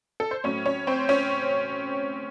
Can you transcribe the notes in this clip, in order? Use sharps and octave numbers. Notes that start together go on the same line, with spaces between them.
A4
C5
A2 F#3 A3 C#4 C#5
C#4 C#5
C4 C5
C#4 C#5